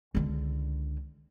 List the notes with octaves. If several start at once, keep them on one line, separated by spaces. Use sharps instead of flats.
C#2 D3